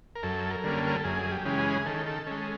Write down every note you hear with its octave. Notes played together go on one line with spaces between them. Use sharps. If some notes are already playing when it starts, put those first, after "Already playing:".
A#4
F#2 A4
A#4
D3 G3 A#3 C#4
A4
A#4
A4
F#2 G#4
G4
C#3 E3 G#3 C#4
G#4
D#3 A4
A4
G#3 C#4 A4